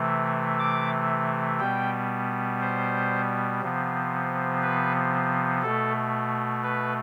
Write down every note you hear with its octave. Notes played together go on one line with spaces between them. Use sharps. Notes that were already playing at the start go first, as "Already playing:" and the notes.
Already playing: C3 E3 A3
D6
B2 G3 B3 G5
C5
C3 F3 B3
B4
B2 A3 A4
B4